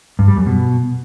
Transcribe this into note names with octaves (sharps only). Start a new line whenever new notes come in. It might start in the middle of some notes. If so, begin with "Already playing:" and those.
G2
G3
F#2
B2